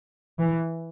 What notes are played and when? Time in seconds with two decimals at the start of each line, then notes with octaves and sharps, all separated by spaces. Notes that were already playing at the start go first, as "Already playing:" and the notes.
0.39 E3